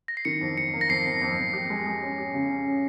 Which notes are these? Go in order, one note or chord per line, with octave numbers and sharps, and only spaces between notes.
A#6
C7
D#3 C#7
F2
F2 C#7
A#3
A#6
F2 C7
F2
F2
F2
G4
G#3
G#3
C#4
G4
C#3
C#4
C#3